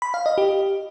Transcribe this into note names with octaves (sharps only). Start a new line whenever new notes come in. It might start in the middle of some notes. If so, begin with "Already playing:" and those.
B5
F5
D#5
G4